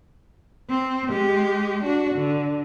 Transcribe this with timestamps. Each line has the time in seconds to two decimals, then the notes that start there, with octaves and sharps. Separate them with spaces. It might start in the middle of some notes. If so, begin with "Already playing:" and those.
0.70 C4
1.09 G#3 G4
1.83 D4 F#4
2.15 D3